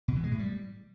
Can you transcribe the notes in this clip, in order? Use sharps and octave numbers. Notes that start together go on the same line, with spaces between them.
B2
E3
G#3
A2
G3